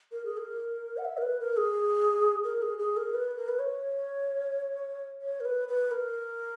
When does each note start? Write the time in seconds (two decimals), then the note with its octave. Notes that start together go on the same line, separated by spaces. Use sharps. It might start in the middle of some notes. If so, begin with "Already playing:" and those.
0.12 A#4
0.25 G#4
0.37 A#4
0.98 F#5
1.05 E5
1.17 A#4
1.22 B4
1.40 A#4
1.57 G#4
2.44 A#4
2.62 G#4
2.78 G#4
2.97 A#4
3.14 B4
3.37 A#4
3.48 B4
3.59 C#5
5.22 C#5
5.40 A#4
5.45 B4
5.68 B4
5.91 A#4